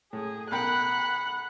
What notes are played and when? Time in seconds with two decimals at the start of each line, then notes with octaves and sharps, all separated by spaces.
0.13 A2 G#4
0.52 B1 A#4 F#5 G5 B5 F#6